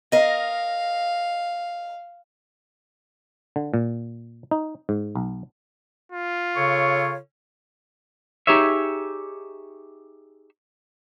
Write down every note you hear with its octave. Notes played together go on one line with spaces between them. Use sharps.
A#4 D#5 F5
D3
A#2
D#4
G#2
B1
F4
C#3 A4 C#5 C#6
D#4 G4 G#4 C#5 E5